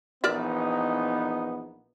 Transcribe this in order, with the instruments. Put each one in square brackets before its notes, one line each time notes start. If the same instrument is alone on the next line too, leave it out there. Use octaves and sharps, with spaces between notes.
[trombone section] A#1 E3 D#4 [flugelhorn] B3 [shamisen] A#4 D5 E5